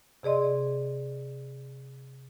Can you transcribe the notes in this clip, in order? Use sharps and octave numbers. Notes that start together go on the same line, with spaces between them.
C3 G#4 D5 D#5 C6